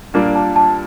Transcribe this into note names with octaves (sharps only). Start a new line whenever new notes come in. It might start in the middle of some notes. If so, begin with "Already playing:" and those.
A#2 G3 A#3 D4
A5
A5